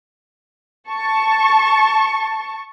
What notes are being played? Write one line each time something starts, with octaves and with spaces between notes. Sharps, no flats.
A5 C#6